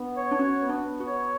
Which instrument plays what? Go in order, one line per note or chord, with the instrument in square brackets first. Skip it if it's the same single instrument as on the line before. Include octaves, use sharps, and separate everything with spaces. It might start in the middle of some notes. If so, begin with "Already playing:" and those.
Already playing: [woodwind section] B3 [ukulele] D4
[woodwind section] C#5
[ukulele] D4
[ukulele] C#4 [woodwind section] F#4
[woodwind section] B3
[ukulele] D4
[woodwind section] B3
[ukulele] F#4
[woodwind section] C#5